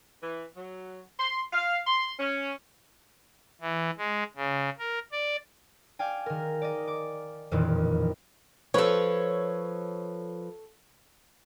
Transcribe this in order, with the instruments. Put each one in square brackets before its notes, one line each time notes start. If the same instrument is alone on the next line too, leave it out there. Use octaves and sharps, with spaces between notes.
[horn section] E3
F#3
C6
F5
C6
C#4
[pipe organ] E3
G#3
C#3
A#4
D5
[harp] D5 F5 G5 G#5
D#3 A#4
D5 D#5
D6
E1 F2 A#2 D#3 E3
[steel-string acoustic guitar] F3 B4 [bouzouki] A4 C#5